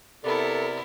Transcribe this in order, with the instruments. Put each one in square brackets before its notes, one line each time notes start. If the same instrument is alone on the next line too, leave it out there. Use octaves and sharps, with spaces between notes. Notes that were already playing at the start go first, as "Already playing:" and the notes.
[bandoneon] C3 D5 [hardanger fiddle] B3 E4 [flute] A4 [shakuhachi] A#4